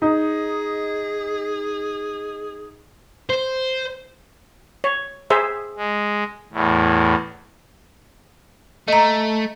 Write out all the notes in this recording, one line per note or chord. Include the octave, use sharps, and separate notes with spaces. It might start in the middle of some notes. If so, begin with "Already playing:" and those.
D#4 G#4
C5
C#5
G#4 C5 E5
G#3
E2 A2
A3 D#5 A#5